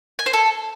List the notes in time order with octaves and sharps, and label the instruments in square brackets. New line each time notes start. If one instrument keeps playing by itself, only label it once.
[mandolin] G#5
C5
A4